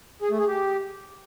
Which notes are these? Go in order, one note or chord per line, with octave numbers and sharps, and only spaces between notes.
G#4
A3
G#4
G4